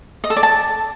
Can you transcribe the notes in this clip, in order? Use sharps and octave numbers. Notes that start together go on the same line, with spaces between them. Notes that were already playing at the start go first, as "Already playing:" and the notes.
D#5
A4
D5
A5